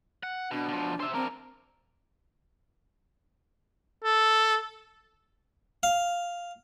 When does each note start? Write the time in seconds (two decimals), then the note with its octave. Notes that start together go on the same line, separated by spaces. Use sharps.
0.23 F#5
0.51 B2 D4
0.69 B2 F3
1.00 C5 E5
1.14 C4 D4 A#4
4.04 A4
5.83 F5